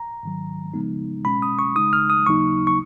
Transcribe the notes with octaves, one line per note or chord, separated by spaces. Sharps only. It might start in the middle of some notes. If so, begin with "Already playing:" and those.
Already playing: A#5
G#2 D#3 F#3
C#3 F3 G#3 B3 D#4
B2 G#3 C#4 B5
D#6
C#6
C#3 G#3 D#4 D#6
F6
D#6
D#2 C#3 F#3 A#3 D#4 C#6
C#6